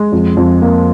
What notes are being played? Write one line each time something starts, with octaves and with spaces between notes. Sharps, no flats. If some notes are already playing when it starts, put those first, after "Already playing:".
Already playing: G#3
F2
F2
A#3